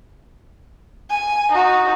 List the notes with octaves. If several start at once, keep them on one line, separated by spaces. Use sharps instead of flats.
G#5
D#4 F#4